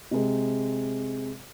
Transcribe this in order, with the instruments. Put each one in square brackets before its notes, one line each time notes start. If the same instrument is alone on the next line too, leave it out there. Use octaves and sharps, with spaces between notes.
[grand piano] C3 G#3